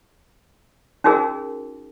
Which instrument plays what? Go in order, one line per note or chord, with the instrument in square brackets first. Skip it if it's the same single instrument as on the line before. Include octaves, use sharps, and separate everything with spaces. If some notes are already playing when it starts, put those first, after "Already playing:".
[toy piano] C#4 D#4 F#4 G#4 A#4